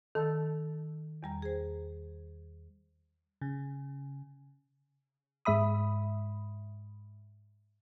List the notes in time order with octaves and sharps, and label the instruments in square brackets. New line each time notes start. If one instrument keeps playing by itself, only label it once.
[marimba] D#3 [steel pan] A4
[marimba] E2 G3 A#5
G#4 C5
[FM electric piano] C#3
[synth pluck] G#2 G#3 E5 B5 D#6